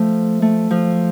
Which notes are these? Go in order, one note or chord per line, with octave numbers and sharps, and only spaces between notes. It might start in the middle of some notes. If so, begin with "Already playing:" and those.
Already playing: F3 A3
A3
F3